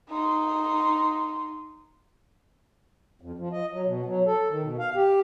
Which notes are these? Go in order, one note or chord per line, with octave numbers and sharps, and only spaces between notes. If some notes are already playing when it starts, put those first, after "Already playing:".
D#4 C6
F2
F3
D#5
F#3
B2
F#3
A4
D#3
B2
F5
G4